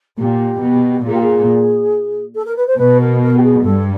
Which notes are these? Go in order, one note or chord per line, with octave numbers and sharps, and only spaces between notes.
A#2 G4
B2
A#2 G#4
G4
G#4
A4
A#4
B4
C5
B2 B4
A#4
A#4
G4
G#4
G2 A4